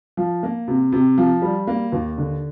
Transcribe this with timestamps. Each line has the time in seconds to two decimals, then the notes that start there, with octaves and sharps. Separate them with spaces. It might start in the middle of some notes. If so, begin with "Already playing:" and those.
0.17 F3
0.43 A#3
0.68 C3
0.92 C3
1.18 F3
1.42 G3
1.67 A#3
1.92 D#2
2.18 D3